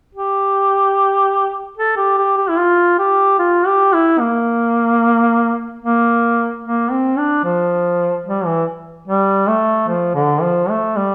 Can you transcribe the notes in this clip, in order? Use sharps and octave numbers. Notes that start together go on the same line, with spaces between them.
G4
A4
G4
G4
G4
E4
F4
G4
F4
G4
E4
A#3
A#3
A#3
C4
D4
F3
G3
E3
G3
A3
F3
D3
F3
A3
G3